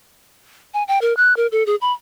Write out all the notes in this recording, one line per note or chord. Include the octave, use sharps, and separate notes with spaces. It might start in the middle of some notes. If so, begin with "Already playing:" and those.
G#5
G5
A#4
F#6
A#4
A4
G#4
B5